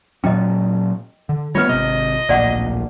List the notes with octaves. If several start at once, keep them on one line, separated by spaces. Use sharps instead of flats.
A#2 F#3 C#4 D#5 G5
D3
G3 A3 B3 F4 B4 C#5
G#1 C3 D#5
D1 A#1 A#2 D5 F#5